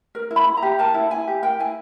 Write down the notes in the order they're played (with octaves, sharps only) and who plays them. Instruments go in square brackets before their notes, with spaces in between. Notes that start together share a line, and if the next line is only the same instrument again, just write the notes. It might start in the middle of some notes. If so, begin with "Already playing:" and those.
[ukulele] A#4
E4
B5
E4
A#5
G4
A#4 A5
E4
E4 G#5
G4
A#4 G5
E4 G#5